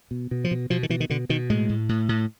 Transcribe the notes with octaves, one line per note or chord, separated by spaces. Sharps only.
B2
B2
F3
B2
B2 F3
D#3
B2 E3
D#3
B2 D3
B2 D#3
A2 G#3
A2
A2
A2